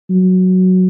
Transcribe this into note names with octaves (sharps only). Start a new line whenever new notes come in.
F#3